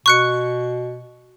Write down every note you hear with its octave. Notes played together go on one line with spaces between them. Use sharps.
B2 C#6 F#6 C#7